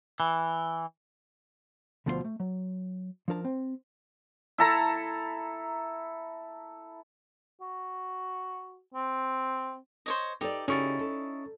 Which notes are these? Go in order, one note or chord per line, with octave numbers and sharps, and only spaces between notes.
E3
D2 B2 F3 F4 G4 C6
A3
F#3
F3 D4 A#4 A5
C4
E4 A4 A#5
F#4
C4
C5 C#5 D#5
D#4 G4 A4 B4 D5
C#3 C#4 D#4 E4 F#4 G4 C#6 A6
A4